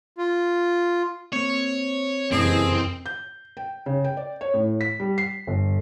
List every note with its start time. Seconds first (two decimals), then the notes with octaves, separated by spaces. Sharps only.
0.18 F4
1.33 A#3 C4 C#5
2.32 F#1 F2 C3 E3 C4 G#4 D#5
3.06 G6
3.57 G5
3.86 C#3
4.04 G5
4.17 D5
4.41 C#5
4.54 A2
4.81 B6
5.00 G3
5.18 C7
5.47 G1